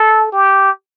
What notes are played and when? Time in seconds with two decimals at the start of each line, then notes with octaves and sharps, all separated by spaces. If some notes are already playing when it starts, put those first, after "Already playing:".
Already playing: A4
0.32 G4